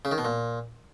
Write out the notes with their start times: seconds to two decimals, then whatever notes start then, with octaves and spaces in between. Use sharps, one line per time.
0.05 C#3
0.11 D#3
0.18 B2
0.25 A#2